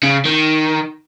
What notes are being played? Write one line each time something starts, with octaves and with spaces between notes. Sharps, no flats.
C#3
D#3